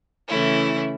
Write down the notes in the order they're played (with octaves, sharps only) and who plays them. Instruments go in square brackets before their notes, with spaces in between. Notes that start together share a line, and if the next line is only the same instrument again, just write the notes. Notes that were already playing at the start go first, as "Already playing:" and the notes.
[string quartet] C#3 E3 A3 C#4 E4